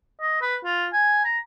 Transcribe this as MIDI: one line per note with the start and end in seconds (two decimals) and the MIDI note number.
0.21 0.40 75
0.42 0.56 71
0.65 0.87 65
0.93 1.20 80
1.25 1.38 82